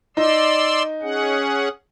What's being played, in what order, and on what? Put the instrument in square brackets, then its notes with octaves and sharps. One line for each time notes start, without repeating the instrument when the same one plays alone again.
[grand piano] D#4 [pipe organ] D5 C6 E6
[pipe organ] C#4 G#4 F#5